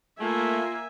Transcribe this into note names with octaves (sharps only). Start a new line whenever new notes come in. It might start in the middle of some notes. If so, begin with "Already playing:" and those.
A3 A#3 F4 E5 G#5